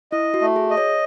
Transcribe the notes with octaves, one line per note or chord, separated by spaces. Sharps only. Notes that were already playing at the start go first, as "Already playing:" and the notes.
E4 D#5
F#4
A3
G#4
D#5
C#5